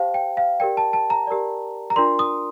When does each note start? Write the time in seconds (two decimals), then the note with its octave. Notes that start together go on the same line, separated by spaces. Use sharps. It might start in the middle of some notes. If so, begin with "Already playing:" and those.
Already playing: G4 C5 F5 G5 A5
0.14 G5
0.37 F5
0.60 G4 A#4 D5 G5
0.77 A5
0.93 A5
1.10 A#5
1.27 G4 A#4 D5
1.90 A#5
1.96 D4 F4 A#4 D5 C6
2.19 D#6